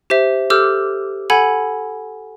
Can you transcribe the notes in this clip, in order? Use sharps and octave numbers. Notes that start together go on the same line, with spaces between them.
G4 C5 E5
G4 A4 D6 E6 F6 G6
A4 F#5 G#5 B5 G#6